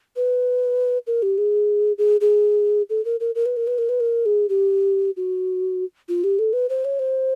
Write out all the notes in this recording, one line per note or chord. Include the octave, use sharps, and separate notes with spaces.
B4
A#4
G4
G#4
G#4
G#4
A4
A#4
A#4
A#4
B4
A#4
B4
A#4
B4
A#4
G#4
G4
F#4
F4
G4
A4
B4
C5
C#5
C5